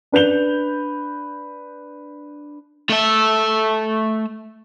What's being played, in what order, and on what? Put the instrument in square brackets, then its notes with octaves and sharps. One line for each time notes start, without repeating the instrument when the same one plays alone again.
[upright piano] D4 B4 G6 F7 G7
[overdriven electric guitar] A3 E5